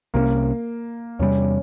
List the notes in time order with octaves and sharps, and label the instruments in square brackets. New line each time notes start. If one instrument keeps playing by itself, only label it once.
[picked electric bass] C2 C3 G3 C#4 [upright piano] A#3
[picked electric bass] E2 C3 G3 [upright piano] C#4